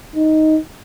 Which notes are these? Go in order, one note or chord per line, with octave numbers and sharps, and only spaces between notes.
D#4